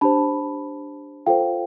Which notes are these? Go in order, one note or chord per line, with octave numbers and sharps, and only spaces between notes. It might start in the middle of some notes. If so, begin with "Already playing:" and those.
D4 G4 C5 A5 B5
F4 A4 C5 F5 G5